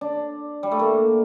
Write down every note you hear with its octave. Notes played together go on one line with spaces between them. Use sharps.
D4
G3
A3
A#3